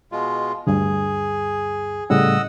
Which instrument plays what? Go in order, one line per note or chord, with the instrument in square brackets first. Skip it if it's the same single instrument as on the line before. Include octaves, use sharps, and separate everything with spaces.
[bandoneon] B2 G#3 F4
[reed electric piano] D2 G2 [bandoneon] G#4
[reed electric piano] A2 C#3 G3 [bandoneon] D#5 F#5 E6